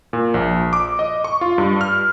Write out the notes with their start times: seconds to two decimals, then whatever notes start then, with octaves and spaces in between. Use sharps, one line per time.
0.13 A#2
0.34 A#1
0.73 D6
0.99 D#5
1.24 C#6
1.41 F4
1.58 G2
1.81 F6